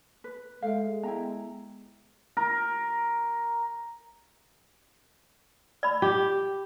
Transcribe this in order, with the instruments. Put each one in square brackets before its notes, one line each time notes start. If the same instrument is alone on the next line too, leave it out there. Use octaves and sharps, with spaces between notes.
[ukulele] B4
[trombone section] G#3 [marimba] A4 E5 [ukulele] F5
[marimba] B3 [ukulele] E4 G5 A#5
[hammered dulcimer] A#4
[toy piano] D5 B5
[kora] G4